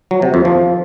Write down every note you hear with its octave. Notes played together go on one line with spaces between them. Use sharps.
F#3
C3
F2
F3